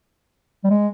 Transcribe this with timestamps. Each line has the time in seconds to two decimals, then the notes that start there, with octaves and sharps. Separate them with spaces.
0.64 G3
0.70 G#3